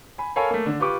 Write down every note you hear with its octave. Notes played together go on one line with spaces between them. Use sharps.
G#5 B5
A4 A#4 C#5 F5 G#5 B5
A3 A#3
D3 D4
F4 G4 B4 C#6 D6